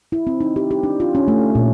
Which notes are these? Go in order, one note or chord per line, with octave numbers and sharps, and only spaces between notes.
E4
C4
D#4
G4
G4
D4
F4
C#4
A3
A#2